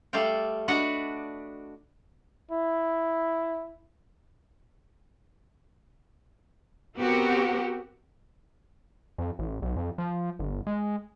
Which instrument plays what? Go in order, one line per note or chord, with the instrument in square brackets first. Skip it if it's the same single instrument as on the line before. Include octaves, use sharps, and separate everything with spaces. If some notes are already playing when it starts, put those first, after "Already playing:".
[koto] G3 A3 D5 F5 G5
D4 F#4 B4 D5 D#5 F#5
[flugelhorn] E4
[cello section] B3 C4 F#4 G4 A#4
[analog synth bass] F2
A1
B1
F2
F3
G1
G#3